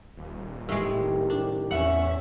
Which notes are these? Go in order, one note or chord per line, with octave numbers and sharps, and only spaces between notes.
D#1
C2 A2 D#3 G#3 G4
D4
E2 C#4 E5 F#5